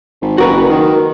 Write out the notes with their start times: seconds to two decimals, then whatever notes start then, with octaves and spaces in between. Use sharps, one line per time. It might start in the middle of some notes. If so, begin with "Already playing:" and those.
0.22 G#1
0.38 F#1 F#4 A#4 B4
0.70 D#3